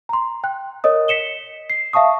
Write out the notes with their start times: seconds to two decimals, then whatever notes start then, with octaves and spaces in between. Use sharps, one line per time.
0.09 A#5 C6
0.44 G5 F#6
0.84 A#4 C#5 D#5 D#6
1.08 B6 C#7 E7 G7
1.70 C7
1.93 E5 F5 A5 C#6 D#6